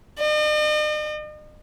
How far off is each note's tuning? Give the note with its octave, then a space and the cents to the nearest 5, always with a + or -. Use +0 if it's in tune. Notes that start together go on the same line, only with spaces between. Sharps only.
D#5 -45